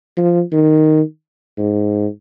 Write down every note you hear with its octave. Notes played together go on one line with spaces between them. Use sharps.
F3
D#3
G#2